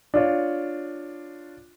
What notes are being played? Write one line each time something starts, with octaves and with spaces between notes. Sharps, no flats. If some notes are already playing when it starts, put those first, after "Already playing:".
D4 F4 C#5